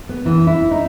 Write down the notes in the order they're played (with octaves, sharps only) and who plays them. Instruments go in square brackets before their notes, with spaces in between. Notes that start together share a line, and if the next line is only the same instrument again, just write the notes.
[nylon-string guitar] B3
E3
E4
D#4